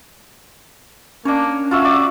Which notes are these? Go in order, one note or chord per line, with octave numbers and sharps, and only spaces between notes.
A#3 C#4 D4 C#5
F4 F#4 C#5 E5
D5